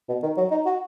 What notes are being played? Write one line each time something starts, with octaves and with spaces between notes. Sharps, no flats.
B2
D#3
F#3
D#4
F#4